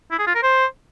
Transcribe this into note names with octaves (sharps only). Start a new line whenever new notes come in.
E4
G#4
F4
A#4
C5